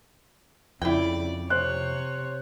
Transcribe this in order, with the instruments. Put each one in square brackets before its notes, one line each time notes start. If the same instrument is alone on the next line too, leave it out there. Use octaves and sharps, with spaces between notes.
[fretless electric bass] F2 [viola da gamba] C#3 D5 [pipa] E4 G5
[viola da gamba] C3 C#5 [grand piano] C5 F#6